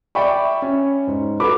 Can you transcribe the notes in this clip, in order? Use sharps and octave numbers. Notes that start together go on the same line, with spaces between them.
D5 E5 G5 B5 C#6
C#4
G#2
F#4 A4 B4 B5 D6